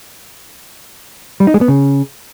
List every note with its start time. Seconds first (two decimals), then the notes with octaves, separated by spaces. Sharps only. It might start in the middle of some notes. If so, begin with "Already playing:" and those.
1.40 G3
1.47 D#4
1.54 G#3
1.61 B3
1.68 C#3